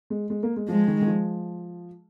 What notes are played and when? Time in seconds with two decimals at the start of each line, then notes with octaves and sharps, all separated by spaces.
0.10 G#3
0.30 G#3
0.43 A#3
0.56 G#3
0.68 F3 G#3
0.88 D#3
1.02 D#3
1.07 F3